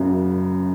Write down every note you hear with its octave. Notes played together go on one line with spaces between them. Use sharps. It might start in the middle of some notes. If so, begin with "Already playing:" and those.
Already playing: F#1 F#2 C#3